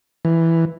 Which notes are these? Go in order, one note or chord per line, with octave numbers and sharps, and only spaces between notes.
E3